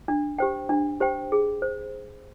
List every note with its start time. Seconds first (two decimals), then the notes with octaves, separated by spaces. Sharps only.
0.08 D4
0.39 G4 C5 G5
0.69 D4
1.01 G4 C5 G5
1.32 G#4
1.62 C5